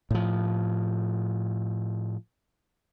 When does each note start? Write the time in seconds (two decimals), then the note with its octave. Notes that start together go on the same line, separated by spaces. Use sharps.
0.11 A2 F3